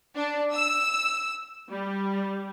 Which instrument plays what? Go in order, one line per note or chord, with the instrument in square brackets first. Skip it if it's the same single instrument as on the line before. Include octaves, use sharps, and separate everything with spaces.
[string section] D4
E6
G3